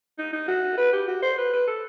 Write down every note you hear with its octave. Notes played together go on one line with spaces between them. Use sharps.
D#4
D#4
F#4
B4
G4
F#4
C5
B4
B4
A4